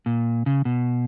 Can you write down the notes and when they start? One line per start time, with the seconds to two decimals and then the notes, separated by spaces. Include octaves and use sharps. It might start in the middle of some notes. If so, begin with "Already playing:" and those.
0.06 A#2
0.46 C#3
0.65 B2